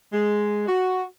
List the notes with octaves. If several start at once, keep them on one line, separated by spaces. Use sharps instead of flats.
G#3
F#4